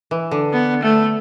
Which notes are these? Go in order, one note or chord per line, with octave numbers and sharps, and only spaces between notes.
E3
D3
B3
A3